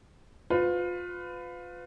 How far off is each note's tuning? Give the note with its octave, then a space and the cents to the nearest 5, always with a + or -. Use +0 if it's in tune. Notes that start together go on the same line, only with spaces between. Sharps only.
F4 +25 B4 +30